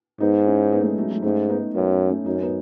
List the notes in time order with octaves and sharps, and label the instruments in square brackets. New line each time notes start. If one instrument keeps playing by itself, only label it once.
[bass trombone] G#2 [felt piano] B3 D#4
[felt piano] C#4 E4
B3 D#4
A3
G#3 B3
F#3 A3
F#3 A3
[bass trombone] G#2 [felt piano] A3 C#4
[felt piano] B3 D#4
[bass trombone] F#2 [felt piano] B3 D#4
[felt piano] A3 C#4
[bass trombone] F#2 [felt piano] D#4
[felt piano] C#4
B3 D#4